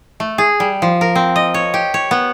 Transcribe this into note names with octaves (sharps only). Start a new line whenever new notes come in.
A3
G#4
G3
F3
A#4
C4
D#5
C#5
G4
C#5
B3